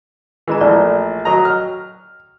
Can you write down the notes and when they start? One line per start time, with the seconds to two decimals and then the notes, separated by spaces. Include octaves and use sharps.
0.48 E3 G#3 F#5 A#5
0.61 A#1 A3 D5
1.25 F#3 D#5 A#5
1.45 G5 F6